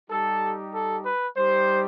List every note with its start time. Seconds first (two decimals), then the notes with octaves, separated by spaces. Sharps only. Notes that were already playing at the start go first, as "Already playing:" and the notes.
0.10 G3 D#4 G4 A4
0.74 A4
1.05 B4
1.37 G3 D#4 G4 C5